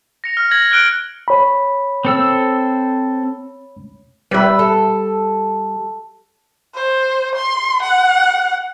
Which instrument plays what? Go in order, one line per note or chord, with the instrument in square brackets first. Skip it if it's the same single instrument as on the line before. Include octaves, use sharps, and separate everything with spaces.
[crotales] A#6 C#7 F7
F6
G#6 A#6 F#7
F6 F#6 D7 G7
[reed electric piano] C#5 B5
[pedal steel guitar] C4 A4 E6
[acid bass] G3 [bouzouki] B4 E5
[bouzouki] A4
[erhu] C5
C6
F#5